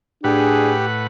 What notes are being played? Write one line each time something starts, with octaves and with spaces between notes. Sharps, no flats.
A2 D4 G4 G#4 B4 F#5